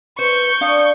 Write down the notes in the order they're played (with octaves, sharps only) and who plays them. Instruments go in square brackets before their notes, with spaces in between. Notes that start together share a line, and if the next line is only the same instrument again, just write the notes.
[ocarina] B4 [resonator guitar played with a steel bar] C5 [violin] C#6 G6
[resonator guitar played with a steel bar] D4 F5 [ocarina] D#6